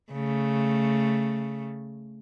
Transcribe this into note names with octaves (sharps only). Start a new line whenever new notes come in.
C#3 A3